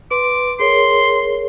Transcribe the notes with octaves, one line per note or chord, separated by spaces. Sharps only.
B4 C6 D6
G#4 A#4 C#5 C6